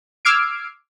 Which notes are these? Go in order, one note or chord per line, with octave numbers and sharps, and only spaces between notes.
D6 E6 F6 G#6 C7 D7